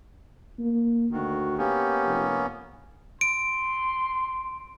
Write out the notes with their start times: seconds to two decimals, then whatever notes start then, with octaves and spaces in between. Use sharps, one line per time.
0.59 A#3
1.12 D2 D#3 F#4
1.58 A#3 B3 C#4 G4
2.05 F1
3.21 C6 D7